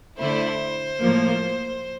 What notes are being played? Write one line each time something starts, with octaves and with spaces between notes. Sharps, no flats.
D3 A3 E4 C5
A2 F3 A#3